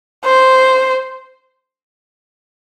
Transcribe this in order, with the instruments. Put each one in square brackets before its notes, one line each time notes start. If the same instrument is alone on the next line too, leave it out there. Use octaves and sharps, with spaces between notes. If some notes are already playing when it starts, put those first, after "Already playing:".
[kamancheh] C5